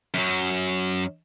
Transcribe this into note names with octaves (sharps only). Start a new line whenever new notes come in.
F#2 F#3